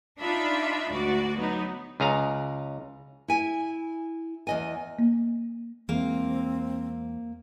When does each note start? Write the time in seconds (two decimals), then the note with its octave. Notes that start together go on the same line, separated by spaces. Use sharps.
0.20 D4 D#4 F4 E5 B5
0.92 D2 G#2 F#4 D5
1.37 F#3 B3 D#4
2.00 C#2 G#4 F5 A#5
3.28 E4 G#5
4.47 E2 D#5 G#5
4.99 A#3
5.89 E2 E3 G#3 A#3 C4